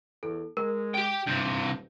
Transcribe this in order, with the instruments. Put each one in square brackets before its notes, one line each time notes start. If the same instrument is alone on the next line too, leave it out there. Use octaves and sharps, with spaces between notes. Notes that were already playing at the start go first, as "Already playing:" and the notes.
[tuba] E2 [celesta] A4
[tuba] G#3 [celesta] A#4
[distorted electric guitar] G4 G5 [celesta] D7
[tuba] D#1 [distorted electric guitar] G2 C3 [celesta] G6